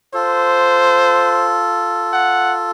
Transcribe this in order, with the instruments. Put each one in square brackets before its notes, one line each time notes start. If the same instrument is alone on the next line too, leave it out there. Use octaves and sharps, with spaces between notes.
[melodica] F4 A4 [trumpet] C5
[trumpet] F#5